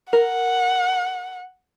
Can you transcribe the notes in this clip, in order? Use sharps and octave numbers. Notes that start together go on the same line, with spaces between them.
A#4 F#5